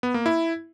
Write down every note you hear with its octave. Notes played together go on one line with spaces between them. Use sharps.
B3
A#3
E4